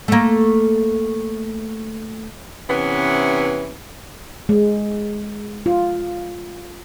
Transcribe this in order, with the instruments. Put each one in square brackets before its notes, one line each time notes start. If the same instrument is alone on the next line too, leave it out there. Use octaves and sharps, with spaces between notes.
[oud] A3 A#3
[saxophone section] C3 E3 B3 C#4
[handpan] G#3
F4